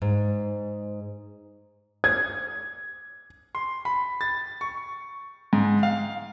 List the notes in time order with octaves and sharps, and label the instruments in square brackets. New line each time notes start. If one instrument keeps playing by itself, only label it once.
[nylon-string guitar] G#2
[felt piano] G#6
[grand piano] C6
B5
A6
C#6
G#2
F5